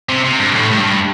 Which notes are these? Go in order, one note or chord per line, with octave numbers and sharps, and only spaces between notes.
C3
C3
G2
A2
A2
G2